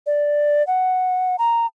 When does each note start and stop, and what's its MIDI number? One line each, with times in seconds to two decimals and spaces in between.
0.06 0.65 74
0.67 1.36 78
1.39 1.66 82